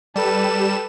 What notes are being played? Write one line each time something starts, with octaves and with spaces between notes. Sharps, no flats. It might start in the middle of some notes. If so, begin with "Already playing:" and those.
G3 A4 B4 E7